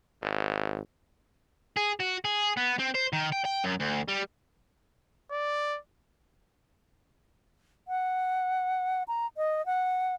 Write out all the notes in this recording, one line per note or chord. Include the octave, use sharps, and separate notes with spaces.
G#1
G#4
F#4
G#4
B3
C4
C5
D#3
G5
G5
F#2
D2
G3
D5
F#5
A#5
D#5
F#5